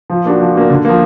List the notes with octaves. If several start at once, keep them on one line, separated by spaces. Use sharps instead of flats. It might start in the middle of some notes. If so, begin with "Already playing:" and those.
F3
A#3 D4 F#4
F3
A#3 D4 F#4
D3
F3 A#3